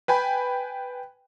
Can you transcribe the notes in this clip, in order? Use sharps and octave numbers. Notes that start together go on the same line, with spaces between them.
B4 G5 G#5 B5